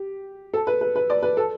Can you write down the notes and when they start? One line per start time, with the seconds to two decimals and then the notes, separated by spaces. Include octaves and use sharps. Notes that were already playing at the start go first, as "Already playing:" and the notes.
Already playing: G4
0.54 A4
0.67 B4
0.81 B4
0.96 B4
1.10 D5
1.23 B4
1.37 A4